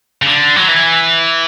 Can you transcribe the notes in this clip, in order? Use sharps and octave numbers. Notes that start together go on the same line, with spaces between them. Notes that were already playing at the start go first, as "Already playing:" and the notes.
C#3
D3
F#3
E3